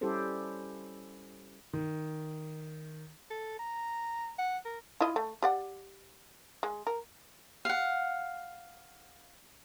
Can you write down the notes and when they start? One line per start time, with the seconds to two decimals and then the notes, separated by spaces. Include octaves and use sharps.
0.01 G3 C#4 E4 G4 A4 C5
1.73 D#3
3.30 A4
3.59 A#5
4.38 F#5
4.65 A#4
5.01 E4 F4 D#5
5.16 A3
5.42 G4 D5 F#5
6.63 G#3
6.87 A#4
7.65 F5 F#5